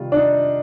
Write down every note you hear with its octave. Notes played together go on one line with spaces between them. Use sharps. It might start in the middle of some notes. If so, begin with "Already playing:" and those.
Already playing: C3 D#3 G3 F4
D4
D#4